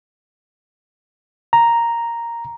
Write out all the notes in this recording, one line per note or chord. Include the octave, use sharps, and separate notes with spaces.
A#5